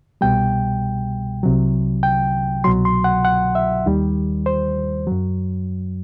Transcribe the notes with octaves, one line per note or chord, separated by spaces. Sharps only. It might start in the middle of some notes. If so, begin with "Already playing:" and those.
C2 B2 G3 G5
C2 C3 F#3
G5
C2 B2 F#3 C6
C6
F#5
F#5
E5
D#2 D#3 G3
C5
F#2 F#3